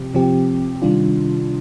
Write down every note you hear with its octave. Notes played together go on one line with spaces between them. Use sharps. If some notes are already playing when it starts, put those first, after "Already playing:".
Already playing: C3 F3 C4 G4
C3 F3 C4 G4
C3 D#3 G3 D4 F4